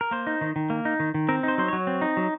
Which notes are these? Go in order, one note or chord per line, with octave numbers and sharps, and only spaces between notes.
A#4
A#3 C5
D#4
D#3
D#3
A#3
D#4
D#3
D#3
C4 A#4
D#4 C5
F#3 C5
F#3 C#5
C4
D#4
F#3